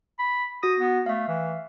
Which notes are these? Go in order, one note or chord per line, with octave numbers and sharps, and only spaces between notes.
B5
F#4 D#6 A#6
B3
A3 E5 F5
E3